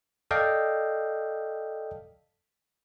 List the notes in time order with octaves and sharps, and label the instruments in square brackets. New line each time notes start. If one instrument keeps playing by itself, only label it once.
[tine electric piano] A4 D5 D#5 F5 G5